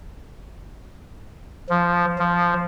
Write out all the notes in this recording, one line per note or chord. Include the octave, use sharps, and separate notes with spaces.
F3
F3